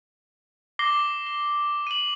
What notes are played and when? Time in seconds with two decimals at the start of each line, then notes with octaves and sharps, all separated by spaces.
0.79 D6 A#6 C7 G7
1.27 G7
1.87 D#7 F#7